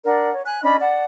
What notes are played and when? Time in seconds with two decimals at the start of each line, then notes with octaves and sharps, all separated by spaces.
0.05 D4 A#4 D5 F#5
0.33 C#5
0.45 G#5 F#6
0.62 C#4 D4 D#5 B5
0.79 D5 F#5 A5